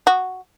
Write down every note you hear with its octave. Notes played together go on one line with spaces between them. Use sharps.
F#4